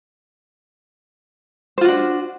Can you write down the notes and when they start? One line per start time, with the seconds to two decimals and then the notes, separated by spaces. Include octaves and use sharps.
1.78 C5
1.81 F4
1.85 F#4
1.88 D4